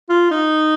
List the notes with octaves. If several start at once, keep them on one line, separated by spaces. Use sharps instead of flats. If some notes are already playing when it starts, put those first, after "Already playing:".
F4
D#4